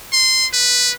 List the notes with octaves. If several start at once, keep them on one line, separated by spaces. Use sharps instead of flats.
C6
B4